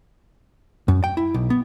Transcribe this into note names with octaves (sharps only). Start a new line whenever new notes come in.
F#2
G5
E4
B1
B3